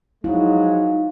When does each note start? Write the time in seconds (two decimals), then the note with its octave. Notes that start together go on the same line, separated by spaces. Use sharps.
0.24 F3 F#3 G#3 D#4 E4 F5